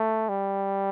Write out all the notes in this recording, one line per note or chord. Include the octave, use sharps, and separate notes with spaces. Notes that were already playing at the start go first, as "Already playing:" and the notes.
Already playing: A3
G3